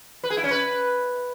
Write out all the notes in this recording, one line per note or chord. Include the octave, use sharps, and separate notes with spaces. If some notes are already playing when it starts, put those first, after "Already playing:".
B4
G#4
E4
C#4
B4